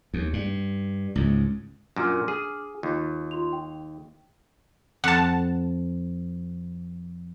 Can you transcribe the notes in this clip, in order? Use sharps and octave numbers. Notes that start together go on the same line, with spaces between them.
D#2
G2
C#2 G#2
F#2 A#2 D4 D6 F6
G#4
D#2 F4
F4 C6 F7
G5
F2 F#5 A5